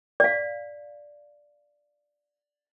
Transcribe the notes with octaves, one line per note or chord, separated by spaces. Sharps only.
D5 F5